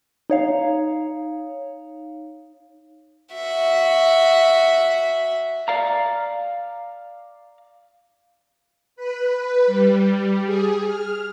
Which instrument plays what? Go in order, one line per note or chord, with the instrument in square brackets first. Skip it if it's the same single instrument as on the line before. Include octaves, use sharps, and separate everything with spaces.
[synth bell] D#4 C#5 F5
[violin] F#4 E5
[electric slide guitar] D5 F5 A#5
[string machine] B4
G3
G#4
F6